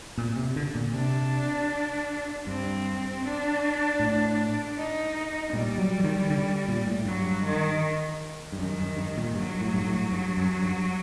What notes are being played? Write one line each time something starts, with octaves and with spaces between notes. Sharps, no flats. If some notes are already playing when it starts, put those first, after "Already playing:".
A#2
C3
D3
A#2
C3 D4
G2 C4
D4
A2
D#4
A#2 G3
F#3
F#3
D#3
D3
A#2
A2
G2 F#3
D#3
G2
F#2 D#3
F#2
G2
A#2
G2 F#3
A2
G2
A2
G2
F#2
G2